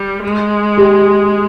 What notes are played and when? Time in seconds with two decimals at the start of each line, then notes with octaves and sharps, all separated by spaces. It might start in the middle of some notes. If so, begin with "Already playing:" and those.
Already playing: G3
0.23 G#3
0.78 G4